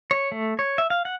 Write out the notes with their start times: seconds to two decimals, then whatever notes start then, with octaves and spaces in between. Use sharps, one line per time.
0.11 C#5
0.32 A3
0.59 C#5
0.78 E5
0.90 F5
1.05 F#5